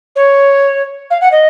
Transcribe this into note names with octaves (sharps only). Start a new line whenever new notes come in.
C#5
F5
F#5
D#5